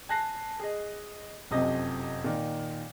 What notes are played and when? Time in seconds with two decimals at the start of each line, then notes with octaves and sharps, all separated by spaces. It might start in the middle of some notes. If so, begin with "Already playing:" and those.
0.09 G#5 A5 F#6 A#6 C7
0.60 G#4 D#5
1.51 F1 F#2 C3 F3 D#5
2.24 A#2 D#3